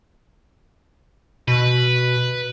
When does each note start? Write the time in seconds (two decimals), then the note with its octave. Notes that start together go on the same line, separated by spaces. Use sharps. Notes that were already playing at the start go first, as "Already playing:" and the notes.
1.48 B2 B4